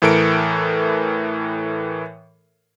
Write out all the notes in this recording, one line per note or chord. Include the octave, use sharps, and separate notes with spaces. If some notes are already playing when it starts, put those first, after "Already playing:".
A2 E3 A4 A#4 C#7 D7